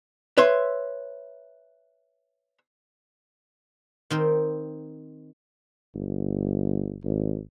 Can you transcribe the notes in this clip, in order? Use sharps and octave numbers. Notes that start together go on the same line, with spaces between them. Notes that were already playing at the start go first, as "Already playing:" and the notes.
B4 C#5 E5 C6
D#3 C4 A#4
G1
G#1